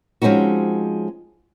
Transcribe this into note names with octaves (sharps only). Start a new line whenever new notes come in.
F3 G#3 C4 C#4 D#4 F#4